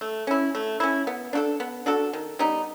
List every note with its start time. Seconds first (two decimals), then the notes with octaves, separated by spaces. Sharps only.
0.01 A3
0.27 C#4 E4
0.55 A3
0.80 C#4 E4
1.07 B3
1.33 D4 F#4 A4
1.60 B3
1.86 D4 F#4 A4
2.13 D#3
2.39 G3 B3 D#4